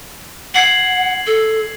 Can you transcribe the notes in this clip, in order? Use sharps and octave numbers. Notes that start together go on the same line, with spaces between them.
F#5 G#6 C7 F#7
A4